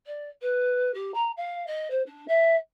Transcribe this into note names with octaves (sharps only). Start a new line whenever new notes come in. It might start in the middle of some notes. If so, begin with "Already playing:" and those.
D5
B4
G4
A#5
F5
D#5
C5
D4
E5